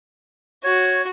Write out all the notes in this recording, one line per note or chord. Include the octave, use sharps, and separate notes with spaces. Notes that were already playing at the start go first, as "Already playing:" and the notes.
F#4 C#5